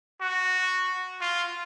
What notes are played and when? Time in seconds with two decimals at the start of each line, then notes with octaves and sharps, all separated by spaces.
0.21 F#4
1.21 F4